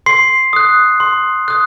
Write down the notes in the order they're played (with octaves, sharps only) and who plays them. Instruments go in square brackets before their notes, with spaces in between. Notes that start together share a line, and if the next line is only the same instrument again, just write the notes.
[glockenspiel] C6 C7
D#6 F#6
C6
D#6 F#6